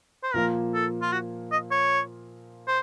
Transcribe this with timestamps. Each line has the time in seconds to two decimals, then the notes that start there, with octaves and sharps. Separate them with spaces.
0.23 C5
0.34 A#2 F3 A#3 A#4
0.74 A4
1.02 F4
1.12 F#4
1.52 D#5
1.71 C#5
2.68 C5